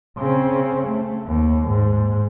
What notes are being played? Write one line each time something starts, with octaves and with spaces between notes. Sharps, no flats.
C#3 C4
A3
D#2
G#2